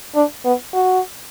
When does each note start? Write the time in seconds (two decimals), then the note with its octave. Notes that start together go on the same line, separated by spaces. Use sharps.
0.15 D4
0.45 B3
0.74 F#4